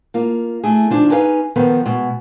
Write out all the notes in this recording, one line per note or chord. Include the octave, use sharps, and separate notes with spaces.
A#3 F4
A3 E4 G#4
D3 F3 D4 D#4 G#4
C#4 D#4 G#4 B4 D5 F5
D#3 F3 B3 F4 A4 B4
B2 G#3